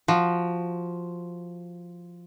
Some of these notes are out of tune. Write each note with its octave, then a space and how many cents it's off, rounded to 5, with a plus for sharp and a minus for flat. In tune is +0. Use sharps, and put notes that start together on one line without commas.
F3 +0 F#4 +0